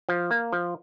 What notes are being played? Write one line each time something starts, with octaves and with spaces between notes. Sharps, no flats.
F3
A#3
F3